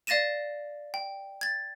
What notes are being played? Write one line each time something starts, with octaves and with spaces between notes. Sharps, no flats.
D5 F5 A6 A#6 D#7 E7
G5
G#6 A6